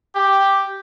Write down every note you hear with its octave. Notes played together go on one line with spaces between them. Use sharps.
G4